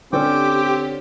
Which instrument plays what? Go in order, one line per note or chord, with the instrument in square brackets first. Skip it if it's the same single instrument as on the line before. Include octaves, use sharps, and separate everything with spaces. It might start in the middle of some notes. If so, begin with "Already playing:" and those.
[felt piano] D3 C#4 A4 [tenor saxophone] C4 [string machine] G4 [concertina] G5 D6